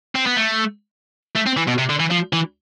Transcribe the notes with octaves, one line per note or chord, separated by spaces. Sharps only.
C4
B3
A3
A3
C4
E3
B2
C3
D3
E3
F3
E3